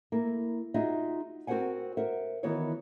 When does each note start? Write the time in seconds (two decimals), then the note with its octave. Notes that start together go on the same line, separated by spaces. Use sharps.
0.12 A#3 E4 A#4
0.74 D#4 F4 F#4 G#4 D#5 E5
1.47 C4 F#4 A#4 C5 F#5 G#5
1.97 A#4 C5 E5 F#5
2.43 D#3 E3 B3 F#4 B4 C#5